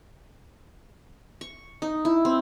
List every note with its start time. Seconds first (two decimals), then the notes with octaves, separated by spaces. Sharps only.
1.41 C#6
1.82 D#4
2.05 E4
2.25 C4